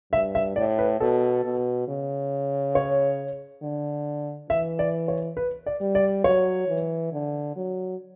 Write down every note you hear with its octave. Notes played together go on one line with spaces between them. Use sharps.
G2 E5
E5
A2 D5
B4
B2 A4
B2
C#3
C#5
D3
E3 E5
D5
C#5
B4
D5
G3
D5
F#3 C#5
E3
D3
F#3